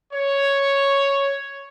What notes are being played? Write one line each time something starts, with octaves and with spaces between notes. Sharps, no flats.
C#5